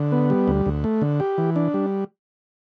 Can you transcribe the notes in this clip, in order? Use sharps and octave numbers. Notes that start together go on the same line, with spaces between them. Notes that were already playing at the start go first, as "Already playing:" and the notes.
Already playing: D3
B3
G3
D2
D2
A3
D3
G4
E3
D4
G3